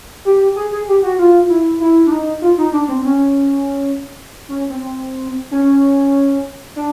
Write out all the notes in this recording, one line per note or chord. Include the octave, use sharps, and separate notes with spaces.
G4
G#4
G#4
G4
F#4
F4
E4
E4
D4
D#4
F4
D#4
D4
C4
C#4
C#4
C4
C#4
D4